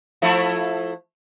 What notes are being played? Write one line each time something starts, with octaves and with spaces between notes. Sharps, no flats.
F3 A3 E4